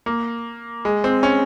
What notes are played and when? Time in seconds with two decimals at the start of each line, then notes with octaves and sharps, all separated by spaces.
0.06 A#3
0.85 G#3
1.04 C4
1.23 C#4